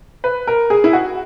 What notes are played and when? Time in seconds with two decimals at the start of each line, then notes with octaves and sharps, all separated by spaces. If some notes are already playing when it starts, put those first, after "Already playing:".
0.24 B4
0.47 A#4
0.70 G#4
0.84 E4
0.93 F#4